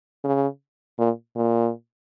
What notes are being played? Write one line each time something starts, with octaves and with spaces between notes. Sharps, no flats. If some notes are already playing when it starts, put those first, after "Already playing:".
C#3
A#2
A#2